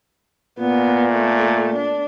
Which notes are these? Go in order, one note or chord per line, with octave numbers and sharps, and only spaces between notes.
A#2 B3
A3
D4